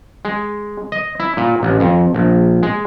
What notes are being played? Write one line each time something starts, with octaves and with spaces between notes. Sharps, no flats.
G#3
D#5
E4
A#2
A1
F2
A#1
G#3